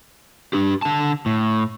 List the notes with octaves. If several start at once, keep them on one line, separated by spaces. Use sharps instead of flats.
D4 G4
D3 A5
A2